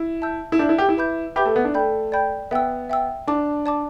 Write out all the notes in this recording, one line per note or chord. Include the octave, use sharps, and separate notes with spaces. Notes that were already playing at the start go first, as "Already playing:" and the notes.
Already playing: E4
E5 A5 E6 G6
E4
D4 E5 A5 E6 G6
E4
G4
E4
B4 E5 B5 D6 G6
G4 B4 E5 B5 D6 G6
A3
B3
D4
A3 D5 G5 B5 G6
D5 G5 B5 G6
B3 E5 G5 E6
E5 G5 E6
D4 D5 A5 D6
D5 A5 D6